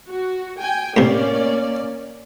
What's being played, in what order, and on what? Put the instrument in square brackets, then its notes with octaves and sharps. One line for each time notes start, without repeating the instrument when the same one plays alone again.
[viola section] F#4
G5 G#5
[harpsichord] A2 C3 [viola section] A#3 C#4 D5